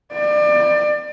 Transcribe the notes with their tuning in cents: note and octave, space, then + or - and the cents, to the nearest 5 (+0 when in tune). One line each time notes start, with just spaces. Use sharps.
D5 +30